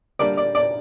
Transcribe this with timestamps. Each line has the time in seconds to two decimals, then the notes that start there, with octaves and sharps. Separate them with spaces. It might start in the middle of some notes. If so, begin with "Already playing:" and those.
0.19 D3 G3 A#3 D5
0.37 D5
0.55 D5